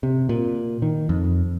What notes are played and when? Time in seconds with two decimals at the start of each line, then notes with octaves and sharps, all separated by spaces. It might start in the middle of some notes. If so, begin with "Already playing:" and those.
0.03 C3
0.29 A#2
0.82 D#3
1.09 F2